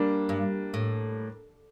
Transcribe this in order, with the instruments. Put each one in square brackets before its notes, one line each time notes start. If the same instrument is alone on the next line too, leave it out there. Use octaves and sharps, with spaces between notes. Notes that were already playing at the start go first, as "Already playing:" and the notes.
Already playing: [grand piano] G3 A#3 D4
[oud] G2
A2